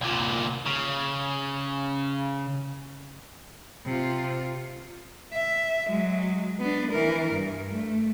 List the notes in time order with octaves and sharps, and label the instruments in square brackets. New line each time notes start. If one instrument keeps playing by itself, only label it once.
[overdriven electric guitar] C2 A#2
C#3
[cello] C3 F4
E5
F#3 G#3
B3 D4
E3 A#4
G2
A3